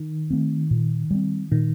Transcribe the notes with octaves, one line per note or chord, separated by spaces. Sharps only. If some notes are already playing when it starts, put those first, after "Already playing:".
Already playing: D#3
A3 C4
A#2
G3 C4
A#2 D#3